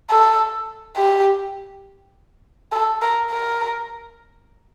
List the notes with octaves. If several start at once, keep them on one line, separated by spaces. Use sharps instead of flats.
A4
G4
A4
A#4
A#4